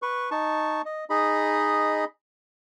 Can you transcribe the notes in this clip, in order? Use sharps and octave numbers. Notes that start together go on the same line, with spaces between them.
B4 C#6
D#4 A5 C#6
D#5
D#4 G#4 D#5 B5